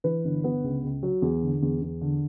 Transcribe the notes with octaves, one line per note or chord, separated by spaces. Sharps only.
E3 B4
G1
B3
C#2
C#2
F#3
E2
D3
E2
E2
D3